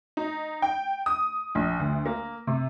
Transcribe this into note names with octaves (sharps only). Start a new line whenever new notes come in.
D#4
G5
D#6
A#1
D2
A#3
C3